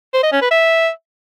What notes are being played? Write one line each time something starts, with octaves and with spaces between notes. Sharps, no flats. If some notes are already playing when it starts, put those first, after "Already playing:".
C5
D#5
C#4
B4
E5